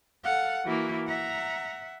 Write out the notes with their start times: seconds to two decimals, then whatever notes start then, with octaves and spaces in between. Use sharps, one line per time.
0.24 A4 F5 F#5
0.65 E3 A#3 E4 F#4
1.07 E5 F#5 A#5